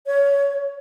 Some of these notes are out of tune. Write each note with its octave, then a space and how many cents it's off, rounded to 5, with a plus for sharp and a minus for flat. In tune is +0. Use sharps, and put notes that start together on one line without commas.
C#5 +20